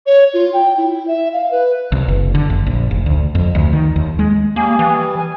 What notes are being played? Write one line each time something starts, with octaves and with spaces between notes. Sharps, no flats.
C#5
F4
G5
E4
E5
F5
B4
C2
F#1
D3
F#1
A#1
F1
D2
F2
D2
D#3
D#2
G#3
G3 A#3 G#4 G#5
E3
G#5